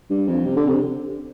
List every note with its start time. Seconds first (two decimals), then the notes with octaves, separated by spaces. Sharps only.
0.10 G2
0.28 F2
0.45 C3
0.56 D3
0.68 C3